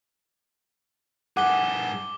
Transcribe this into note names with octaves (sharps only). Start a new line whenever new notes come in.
G2 G#4 F#5 D6 G7